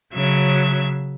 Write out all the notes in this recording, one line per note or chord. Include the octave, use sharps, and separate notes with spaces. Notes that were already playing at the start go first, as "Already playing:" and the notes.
C#3 F#3 E5